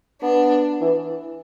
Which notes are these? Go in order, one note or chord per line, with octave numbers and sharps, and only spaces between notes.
B3 D4
E3